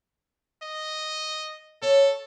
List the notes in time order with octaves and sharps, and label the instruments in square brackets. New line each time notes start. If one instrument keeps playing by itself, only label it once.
[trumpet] D#5
[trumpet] A4 [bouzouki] C#5